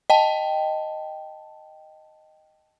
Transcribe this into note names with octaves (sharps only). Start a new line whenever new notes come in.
D#5 G5 A5